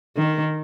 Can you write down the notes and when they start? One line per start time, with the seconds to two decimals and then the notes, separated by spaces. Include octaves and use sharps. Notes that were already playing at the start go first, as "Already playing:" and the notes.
0.17 D#3